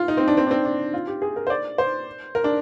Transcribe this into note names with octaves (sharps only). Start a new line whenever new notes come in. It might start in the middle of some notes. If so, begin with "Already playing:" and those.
Already playing: F4
D#4
C4
D4
C4
D4
C4
D4
F4
G4
G#4
A#4
C5
D5
C5
A#4
D4